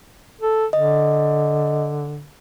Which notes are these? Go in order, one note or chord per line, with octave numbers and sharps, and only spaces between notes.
A4
D3 D#5